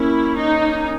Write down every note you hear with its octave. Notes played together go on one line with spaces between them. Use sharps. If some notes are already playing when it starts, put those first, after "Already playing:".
Already playing: A#3 C#4 E4
D#4